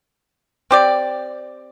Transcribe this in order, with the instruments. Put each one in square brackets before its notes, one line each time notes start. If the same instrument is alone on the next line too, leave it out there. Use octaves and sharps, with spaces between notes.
[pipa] C4 G4 D5